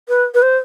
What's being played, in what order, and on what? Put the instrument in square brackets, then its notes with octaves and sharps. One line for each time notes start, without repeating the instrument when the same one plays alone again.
[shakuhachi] B4
B4
C5